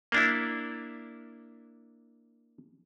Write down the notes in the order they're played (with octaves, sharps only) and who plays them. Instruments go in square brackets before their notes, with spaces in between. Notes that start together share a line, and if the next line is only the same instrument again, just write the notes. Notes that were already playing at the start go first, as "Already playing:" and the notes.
[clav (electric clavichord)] A#3 D4 E4